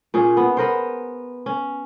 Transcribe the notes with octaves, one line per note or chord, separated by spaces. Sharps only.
A#2 C#4 G#4
B3
B3 A#4 C5
C#4